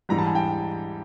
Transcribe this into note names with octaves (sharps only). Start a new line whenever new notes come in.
G#2 E3 G3 A#5
A5
G#5
G5 A5